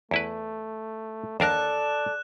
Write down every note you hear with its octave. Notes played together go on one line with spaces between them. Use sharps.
E2 A3 E4 B4
D#2 D4 A4 A#4 D5 A5 F#6 E7